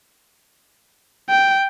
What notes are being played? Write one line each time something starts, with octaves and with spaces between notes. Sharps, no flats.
G5